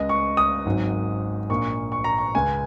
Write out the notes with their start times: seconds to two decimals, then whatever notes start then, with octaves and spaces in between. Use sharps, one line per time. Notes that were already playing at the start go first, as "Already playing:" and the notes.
Already playing: C#2 C#3 G#3 D#5
0.09 C#6
0.37 D#6
0.66 G#1 G#2 D#3 F#3
1.49 A#1 A#2 A#3 C#6
1.92 C#6
2.04 A#5
2.18 C#6
2.34 C#2 C#3 G#3 G#5